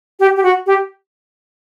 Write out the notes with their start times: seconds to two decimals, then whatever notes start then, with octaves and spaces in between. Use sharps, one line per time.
0.20 G4
0.37 G4
0.43 F#4
0.66 G4